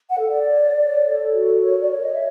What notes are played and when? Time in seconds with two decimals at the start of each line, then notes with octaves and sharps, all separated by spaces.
0.10 F#5
0.19 A4
0.29 D5
0.48 C#5
0.76 C#5
1.05 A4
1.33 F#4
1.61 A#4 C#5
1.81 D5
1.90 C#5
2.00 D#5
2.13 E5